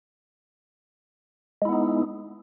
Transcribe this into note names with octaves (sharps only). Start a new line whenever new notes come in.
G#3 B3 D#4 E4